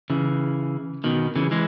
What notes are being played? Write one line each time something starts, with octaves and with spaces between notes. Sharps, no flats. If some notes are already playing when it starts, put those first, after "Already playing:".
C#3 E3
B2 D#3
C#3 E3
E3 G#3